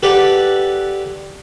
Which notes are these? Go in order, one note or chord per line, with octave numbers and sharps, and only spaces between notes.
G4 A4 B4 D5 F#5